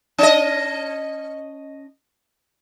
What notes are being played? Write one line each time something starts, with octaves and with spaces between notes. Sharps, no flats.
C#4 D#5